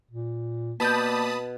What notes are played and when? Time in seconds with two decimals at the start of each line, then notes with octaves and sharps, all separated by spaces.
0.11 A#2
0.80 B2 A#3 G4 D5 A5 B5 D#6 G6